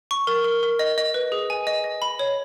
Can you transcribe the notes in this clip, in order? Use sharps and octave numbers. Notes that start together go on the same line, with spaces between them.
C#6
A#4
A#4
A#4
D#5
D#5
B4
G#4
G#5
D#5
D#5
B5
C#5